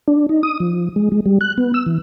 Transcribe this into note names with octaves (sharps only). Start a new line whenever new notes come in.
D4
D#4
D#6
F3
G#3
G#3
G3
F#6
B3
E6
E3